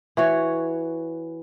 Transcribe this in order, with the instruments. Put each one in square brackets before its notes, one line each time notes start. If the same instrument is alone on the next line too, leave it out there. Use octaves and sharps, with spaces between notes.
[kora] E3 F#4 C#5